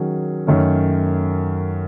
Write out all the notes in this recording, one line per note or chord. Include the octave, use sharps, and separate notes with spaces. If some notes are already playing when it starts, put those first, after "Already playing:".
Already playing: D#3 F#3 C#4 G#4
F#2 D#3 A3 C#4